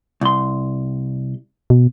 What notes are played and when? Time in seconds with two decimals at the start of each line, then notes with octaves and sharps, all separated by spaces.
0.21 C2 C6
1.70 B2